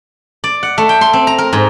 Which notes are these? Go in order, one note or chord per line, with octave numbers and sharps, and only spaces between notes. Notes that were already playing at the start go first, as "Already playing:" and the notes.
D5
F#5
A3
G5
C6
C4
A#5
A#4
G#2